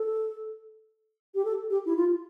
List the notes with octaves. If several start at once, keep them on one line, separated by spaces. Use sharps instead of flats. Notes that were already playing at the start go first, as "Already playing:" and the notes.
Already playing: A4
G4
A4
G4
E4
F4